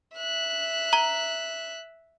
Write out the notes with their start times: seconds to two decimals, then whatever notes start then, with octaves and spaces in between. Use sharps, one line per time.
0.17 E5 F#6
0.93 A#5 G7